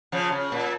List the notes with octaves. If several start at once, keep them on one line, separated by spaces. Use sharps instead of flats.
C#3 F3
C#3
A#2